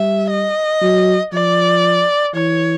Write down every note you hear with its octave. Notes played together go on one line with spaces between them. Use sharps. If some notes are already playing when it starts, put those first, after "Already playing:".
Already playing: G3 E5
D#5
F#3
F3 D5
E3 C#5